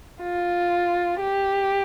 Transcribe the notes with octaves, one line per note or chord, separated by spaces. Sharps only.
F4
G4